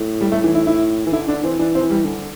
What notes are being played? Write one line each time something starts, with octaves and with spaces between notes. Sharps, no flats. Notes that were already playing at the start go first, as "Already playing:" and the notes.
Already playing: A2
G3
A3
E3
E4
E4
E3
D3 E4
D3 D4
E3 C4
E3 D4
C4
E3
G3
D3